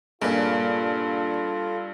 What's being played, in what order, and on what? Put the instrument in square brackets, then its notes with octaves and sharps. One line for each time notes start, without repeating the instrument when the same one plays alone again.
[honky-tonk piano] G2 [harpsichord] A#2 C#3 [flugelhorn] F4 [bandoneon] A4